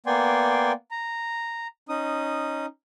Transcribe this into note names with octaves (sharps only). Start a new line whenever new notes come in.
A#3 B3 D5 G5 G#5 C6
A#5
C#4 D#4 D#6